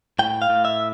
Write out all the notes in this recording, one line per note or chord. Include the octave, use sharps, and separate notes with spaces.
A2 G5
F5
A2
E5